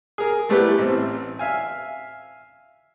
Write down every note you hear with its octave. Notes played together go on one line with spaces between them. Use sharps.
G#4 A#4
G3 A3 B3 E4 G4 B4
A1 C4
E5 F5 G#5